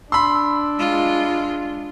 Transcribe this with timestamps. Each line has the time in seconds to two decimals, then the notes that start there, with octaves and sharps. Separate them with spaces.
0.12 D4 B5 C6 E6
0.78 G#3 F4